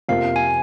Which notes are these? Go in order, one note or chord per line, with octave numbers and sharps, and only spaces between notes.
F2 C3 F3 A#3 F5
G#5